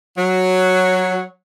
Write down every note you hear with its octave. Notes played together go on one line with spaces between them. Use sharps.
F#3